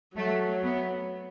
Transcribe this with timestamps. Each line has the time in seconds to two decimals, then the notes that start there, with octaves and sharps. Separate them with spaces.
0.16 F#3 A3
0.63 B3